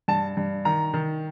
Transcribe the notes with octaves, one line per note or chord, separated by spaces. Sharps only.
G2 A5
G2
D#3 A#5
D#3